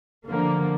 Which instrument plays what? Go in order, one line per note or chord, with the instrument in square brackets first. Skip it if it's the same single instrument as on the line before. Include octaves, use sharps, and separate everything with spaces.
[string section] D3 F3 A#3